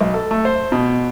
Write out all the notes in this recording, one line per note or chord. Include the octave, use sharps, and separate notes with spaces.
B1
A4
A3
C5
B2